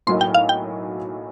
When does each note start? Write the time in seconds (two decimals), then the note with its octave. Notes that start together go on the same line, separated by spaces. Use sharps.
0.07 B1 A2 F#3 A#3 D#4 C6
0.21 G5
0.34 F5
0.49 G5